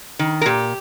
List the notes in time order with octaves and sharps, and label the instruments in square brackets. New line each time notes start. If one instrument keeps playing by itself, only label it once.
[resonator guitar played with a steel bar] D#3
A#4
A#2 G4